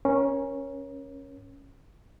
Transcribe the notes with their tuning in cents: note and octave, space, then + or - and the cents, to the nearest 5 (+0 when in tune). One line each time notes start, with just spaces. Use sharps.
C#4 -5 A#4 +25